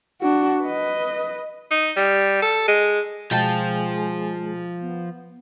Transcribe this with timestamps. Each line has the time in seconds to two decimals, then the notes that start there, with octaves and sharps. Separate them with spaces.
0.22 D4 F#4
0.63 B4 D#5
1.71 D#4
1.96 G3
2.42 A4
2.68 G#3
3.31 B2 F3 G#3 F4 G5 A5
4.81 B3